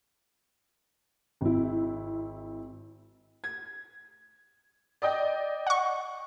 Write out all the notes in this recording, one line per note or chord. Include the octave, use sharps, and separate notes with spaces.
G#1 E4
G#6
D5 D#5 G5
F#5 C#6